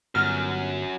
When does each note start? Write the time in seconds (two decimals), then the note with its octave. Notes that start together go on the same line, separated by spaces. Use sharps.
0.15 G1 F#2 F#3 F6